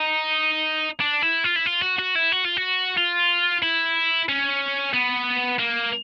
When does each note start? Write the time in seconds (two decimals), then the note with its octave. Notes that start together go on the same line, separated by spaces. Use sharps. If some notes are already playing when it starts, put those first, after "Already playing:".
Already playing: D#4
1.00 D4
1.22 E4
1.44 F4
1.56 E4
1.66 F4
1.82 F#4
1.99 F#4
2.16 E4
2.32 F#4
2.45 F4
2.57 F#4
2.97 F4
3.62 E4
4.29 C#4
4.94 B3
5.59 A#3